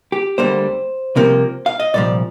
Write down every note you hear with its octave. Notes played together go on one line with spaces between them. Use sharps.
G4
D2 D3 G3 A#3 C5
C2 C3 F3 A#3
F5
D#5
C2 A#2 F3 D5